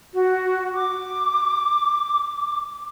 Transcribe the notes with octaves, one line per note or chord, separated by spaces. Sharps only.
F#4
D6